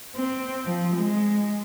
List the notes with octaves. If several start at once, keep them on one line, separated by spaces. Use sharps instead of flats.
C4
F3
G#3